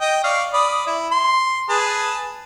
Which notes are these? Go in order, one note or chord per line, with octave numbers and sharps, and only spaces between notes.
D#5 G5
D5 F5 C#6
D5 B5 D#6
E4
C6
G#4 B4 A5